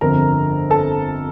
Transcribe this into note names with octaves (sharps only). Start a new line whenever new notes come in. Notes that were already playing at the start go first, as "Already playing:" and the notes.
G1 F2 D3 A#4 A#5
A4 A5